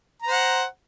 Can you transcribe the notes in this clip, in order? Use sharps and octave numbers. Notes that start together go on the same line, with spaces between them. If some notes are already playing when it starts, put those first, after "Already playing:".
C5 F#5 A#5